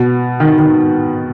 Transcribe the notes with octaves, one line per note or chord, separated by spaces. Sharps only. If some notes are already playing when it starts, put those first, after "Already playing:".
Already playing: B2
D#3
D#3